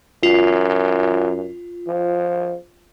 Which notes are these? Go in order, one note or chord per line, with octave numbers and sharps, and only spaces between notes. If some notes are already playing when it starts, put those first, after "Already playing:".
F#2 F4
F3